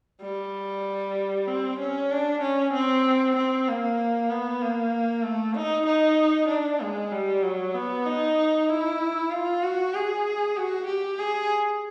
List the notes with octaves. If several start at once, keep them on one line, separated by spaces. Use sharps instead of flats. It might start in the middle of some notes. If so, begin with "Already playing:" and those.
G3
C4
C#4
D4
C#4
C4
C4
A#3
B3
A#3
A3
D#4
D#4
D4
G#3
G3
F#3
B3
D#4
E4
F4
F#4
G#4
F#4
G4
G#4